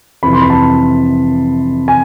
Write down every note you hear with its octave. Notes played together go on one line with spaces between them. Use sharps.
F2 C3 E3 B5
C6
B5
A5
G#5